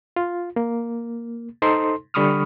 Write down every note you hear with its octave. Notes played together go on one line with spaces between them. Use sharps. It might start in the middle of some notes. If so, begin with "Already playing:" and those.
F4
A#3
D#4 A4 C5 C6
D3 G3 B5 C#6 D#6 F6